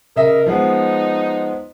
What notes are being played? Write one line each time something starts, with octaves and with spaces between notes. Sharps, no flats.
C#3 A#4 D#5 E5
F3 G#3 B3 D#4